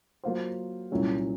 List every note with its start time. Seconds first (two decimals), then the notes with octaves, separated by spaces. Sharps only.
0.24 F#3 A#3 F4 C5
0.91 C2 A#2 F#3 C#4 F#4